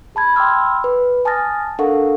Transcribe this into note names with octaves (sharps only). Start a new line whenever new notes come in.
G#4 A5 B5 G#6
G5 B5 C6 D6 E6 F6
B4
G#5 A5 D#6 F6 A6 A#6
D4 A4 A#4 F5 F#5 C#6